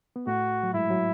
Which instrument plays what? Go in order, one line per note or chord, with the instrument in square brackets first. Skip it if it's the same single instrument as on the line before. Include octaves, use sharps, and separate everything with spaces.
[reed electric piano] B3
[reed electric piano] A2 A3 [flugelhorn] F#4
[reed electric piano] F#3
[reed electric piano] G#2 G#3 [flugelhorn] E4
[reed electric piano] F#3